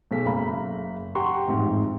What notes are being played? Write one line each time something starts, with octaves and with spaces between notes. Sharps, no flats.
B1 G#3 A4 B6
F#1 F5 A#5 B5
G4 F#5 G5 A#5 C6 C#6
A1 F2 G#2